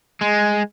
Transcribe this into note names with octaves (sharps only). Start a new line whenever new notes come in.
G#3